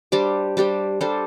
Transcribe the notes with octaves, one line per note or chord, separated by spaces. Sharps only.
G3 D4 G4 C5
G3 D4 G4 C5
G3 D4 A4 C5